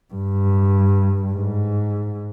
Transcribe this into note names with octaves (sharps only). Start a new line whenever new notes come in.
G2
G#2